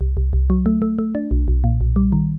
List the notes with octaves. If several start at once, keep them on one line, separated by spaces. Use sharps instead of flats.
C2
C2
C2
F#3
A3
A3
A3
D4
B1
B1
A#2
B1
G3
D#3